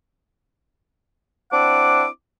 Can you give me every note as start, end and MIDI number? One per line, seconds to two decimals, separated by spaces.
1.51 2.05 60
1.51 2.05 62
1.51 2.05 64
1.51 2.05 78
1.51 2.05 86